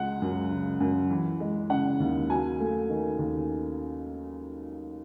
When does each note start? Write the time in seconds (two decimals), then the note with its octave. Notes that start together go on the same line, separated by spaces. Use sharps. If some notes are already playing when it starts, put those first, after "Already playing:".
Already playing: C#2 G#3 F#5
0.22 F#2
0.51 C#3
0.80 F#2
1.11 E3
1.40 G#3
1.70 C#3 F#5
2.00 D#2
2.30 F#3 G#5
2.60 A3
2.89 D#3
3.19 D#2